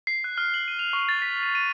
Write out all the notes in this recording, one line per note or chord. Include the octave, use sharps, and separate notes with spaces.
C7
F#6
F6
F#7
D#7
F7
C#6
A6
B6
D#7
D#7